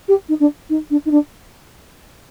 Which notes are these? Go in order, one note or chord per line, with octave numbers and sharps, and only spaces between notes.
G4
D#4
D4
D#4
D4
D#4
D4